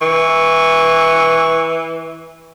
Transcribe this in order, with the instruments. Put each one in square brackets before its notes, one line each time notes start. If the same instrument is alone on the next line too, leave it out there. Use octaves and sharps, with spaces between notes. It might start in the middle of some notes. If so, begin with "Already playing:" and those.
[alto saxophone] E3 [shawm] C#6